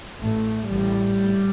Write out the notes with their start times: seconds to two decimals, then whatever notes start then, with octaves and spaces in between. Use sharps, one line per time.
0.20 A1 A2 A3
0.71 A1 A2 G3
1.22 A2